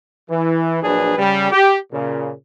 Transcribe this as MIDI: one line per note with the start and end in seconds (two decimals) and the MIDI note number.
0.30 0.83 52
0.83 1.17 34
0.83 1.17 54
0.83 1.17 62
0.83 1.17 68
0.83 1.17 71
1.18 1.50 49
1.18 1.50 55
1.52 1.77 67
1.93 2.33 46
1.93 2.33 49